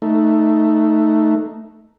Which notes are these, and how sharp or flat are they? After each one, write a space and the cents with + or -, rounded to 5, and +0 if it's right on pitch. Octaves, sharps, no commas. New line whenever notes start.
A3 +0 D#4 +0